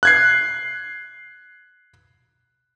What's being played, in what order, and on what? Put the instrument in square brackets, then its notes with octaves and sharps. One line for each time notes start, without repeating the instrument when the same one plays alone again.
[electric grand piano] F#6 G#6 C7